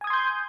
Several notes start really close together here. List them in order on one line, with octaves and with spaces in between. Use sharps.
G#5 D#6 G#6 C6 G6